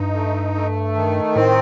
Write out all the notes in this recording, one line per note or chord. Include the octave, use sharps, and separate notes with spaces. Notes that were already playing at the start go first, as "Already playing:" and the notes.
Already playing: G2 D#4
A3
A3
D#3
A2 C4